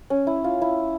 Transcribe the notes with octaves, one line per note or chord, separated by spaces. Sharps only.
C#4
E4
F4
E4